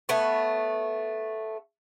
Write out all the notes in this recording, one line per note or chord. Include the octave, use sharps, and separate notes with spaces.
A3 B3 C#5